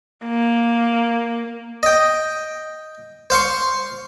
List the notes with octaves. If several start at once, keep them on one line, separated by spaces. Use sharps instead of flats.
A#3
D#5 G5
C5 F5 C6 C#6